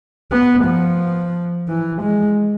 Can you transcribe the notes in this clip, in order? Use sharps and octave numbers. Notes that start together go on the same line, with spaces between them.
B3
F3
E3
G#3